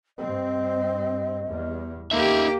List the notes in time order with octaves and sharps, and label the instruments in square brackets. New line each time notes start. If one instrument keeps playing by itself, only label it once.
[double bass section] G2 C4 [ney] D#5
[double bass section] E2 G3
[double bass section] D#2 [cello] A#3 G4 [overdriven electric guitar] D#4 E5 [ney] A4